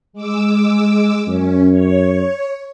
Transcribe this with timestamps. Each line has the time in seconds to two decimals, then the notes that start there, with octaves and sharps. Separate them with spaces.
0.13 G#3 D6 E6
1.28 F#2 C#4
1.72 C#5